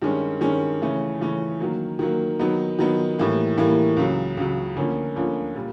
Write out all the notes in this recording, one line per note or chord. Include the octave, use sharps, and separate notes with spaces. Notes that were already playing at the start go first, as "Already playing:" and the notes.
G2 D#3 G#3 C#4
G2 D#3 G#3 C#4
C#3 E3 A3 C#4
C#3 E3 A3 C#4
D#3 F#3 A#3
D#3 F#3 A#3
D#3 F#3 B3 D#4
D#3 F#3 B3 D#4
A2 E3 G3 A#3
A2 E3 G3 A#3
C#2 C#3 F#3
C#2 C#3 F#3
D2 D3 F3 A#3 C#4
D2 D3 F3 A#3 C#4
A#2 G3